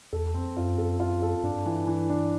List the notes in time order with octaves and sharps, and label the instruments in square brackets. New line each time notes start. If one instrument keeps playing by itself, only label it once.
[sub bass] E2 [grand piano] A4
[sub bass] F2 [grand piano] C4
[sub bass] F#2 [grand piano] F4
[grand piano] A4
F4
A4
[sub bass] G2 [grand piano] D4
[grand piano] E3
E3
D4